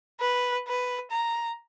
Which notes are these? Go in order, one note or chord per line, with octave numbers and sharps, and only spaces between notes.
B4
B4
A#5